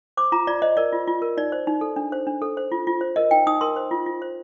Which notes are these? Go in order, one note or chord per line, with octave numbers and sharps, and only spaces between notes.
C5 D6
F4 A#5
F4 D5
C5 D#5
A#4 D5
F4
F4
A#4
D#4 D5
C5
D#4
A4
D4
C5
D4
A4
C5
F4
F4
C5
A#4 D#5
D#4 G5
D#4 D#6
A#4 C6
C5
F4
F4
C5